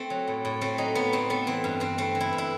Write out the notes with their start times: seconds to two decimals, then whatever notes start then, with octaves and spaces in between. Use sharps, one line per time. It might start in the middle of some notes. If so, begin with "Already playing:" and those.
Already playing: A3 C4
0.10 F#3
0.28 A2
0.45 A2
0.61 A3 C4
0.78 F#3 D#4
0.95 A2 B3
1.12 A2 C4
1.30 A3 B3
1.47 E3 C4
1.64 G2
1.80 G2 C4
1.98 A3 C4
2.15 E3
2.20 E4
2.33 G2
2.38 E4